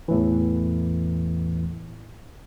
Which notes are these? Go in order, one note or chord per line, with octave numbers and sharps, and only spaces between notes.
E2 A2 E3